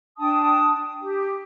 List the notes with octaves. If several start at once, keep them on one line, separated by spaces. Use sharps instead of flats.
D4 G5 A5 D#6
G4